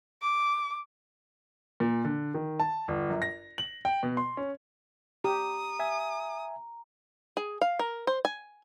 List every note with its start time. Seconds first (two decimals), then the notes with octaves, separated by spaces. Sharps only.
0.22 D6
1.80 A#2
2.05 D3
2.34 D#3
2.60 A5
2.88 G1
3.10 F#2
3.22 A#6
3.58 F#7
3.85 G5
4.03 B2
4.17 C6
4.37 C#4
5.24 G4 A#5 D#6
5.79 E5 G#5
7.37 G#4
7.62 F5
7.79 A#4
8.07 C5
8.25 G#5